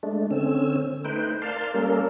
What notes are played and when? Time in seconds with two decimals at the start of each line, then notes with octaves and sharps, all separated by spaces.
0.03 G#3 A3 D4
0.31 D3 C4 C#4 E6
1.05 A3 D#4 B4 C5 G5
1.42 A#4 D5 F5 A5 C6 F6
1.74 G3 A#3 C#4 A4 A#4